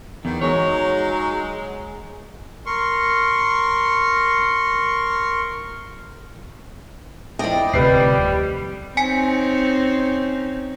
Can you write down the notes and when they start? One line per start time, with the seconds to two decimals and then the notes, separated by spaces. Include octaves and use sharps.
0.25 E2 D#3
0.41 F#3 G#3 D#4 C#5
2.66 A#4 C6 C#6
7.39 F2 E4 D5 D#5 G5
7.73 D1 A2 C3 G3 B4 C7
8.97 C4 C#4 D#4 G#5 B6 C#7